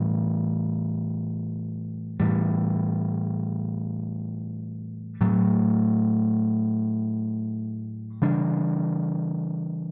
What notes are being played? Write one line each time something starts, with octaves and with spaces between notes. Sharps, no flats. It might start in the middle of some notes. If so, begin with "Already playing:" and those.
Already playing: A2 E3 G3
A2 E3 G3
A2 F#3 A3
C#3 E3 G3 D4